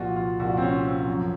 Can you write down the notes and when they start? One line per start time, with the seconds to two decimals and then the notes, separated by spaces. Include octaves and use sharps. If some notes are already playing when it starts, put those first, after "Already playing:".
Already playing: C2 A#2 F3 F4 F#4
0.16 F4
0.40 C2 A#2 F3 F#4
0.57 C4
0.62 C#4
0.85 C4
1.08 F#2 F3